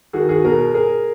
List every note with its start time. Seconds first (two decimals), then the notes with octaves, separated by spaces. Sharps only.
0.13 D#3 F#4 G#4
0.29 F#4 G#4
0.44 B2 G#4 A#4
0.74 G#4 A#4